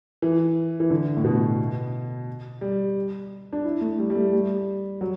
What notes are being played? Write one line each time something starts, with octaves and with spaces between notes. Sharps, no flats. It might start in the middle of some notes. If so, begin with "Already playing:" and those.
E3
E3
D3
A2
B2
G3
D4
E4
A3
G3
G3
A3
G3
F#3